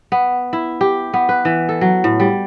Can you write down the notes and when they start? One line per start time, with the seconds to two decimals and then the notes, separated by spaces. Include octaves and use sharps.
0.12 B3
0.53 E4
0.81 G4
1.14 B3
1.29 B4
1.45 E3
1.69 A4
1.81 F#3
2.04 A2
2.20 G3